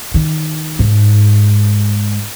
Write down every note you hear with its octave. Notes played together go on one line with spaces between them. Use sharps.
D#3
G#2